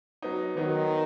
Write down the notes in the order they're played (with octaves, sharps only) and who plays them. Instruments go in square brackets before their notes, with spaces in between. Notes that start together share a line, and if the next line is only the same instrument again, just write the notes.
[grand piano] F#3 B3 D#4
[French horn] D#3 [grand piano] F#3 B3 D#4